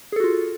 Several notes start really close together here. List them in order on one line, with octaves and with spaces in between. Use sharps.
G#4 A4 F#4 F4